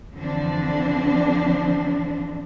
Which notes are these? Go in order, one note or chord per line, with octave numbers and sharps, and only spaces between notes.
F2 D3 E3 F3 C4 D4